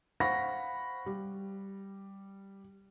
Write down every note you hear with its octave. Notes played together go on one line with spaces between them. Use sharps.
C5 F5 F#5 B5 C#6 A#6
G3